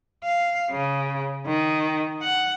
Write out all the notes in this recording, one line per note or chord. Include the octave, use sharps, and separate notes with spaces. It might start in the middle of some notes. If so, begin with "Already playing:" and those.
F5
C#3
D#3
F#5